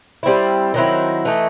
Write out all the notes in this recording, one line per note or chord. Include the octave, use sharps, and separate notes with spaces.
G3 C4 E4
D#3 F#3 C4 E4
E3 A3 D#4